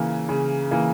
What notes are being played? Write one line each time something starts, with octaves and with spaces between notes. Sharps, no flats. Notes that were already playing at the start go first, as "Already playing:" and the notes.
Already playing: C#3 E3 A#3
C#3
E3 A#3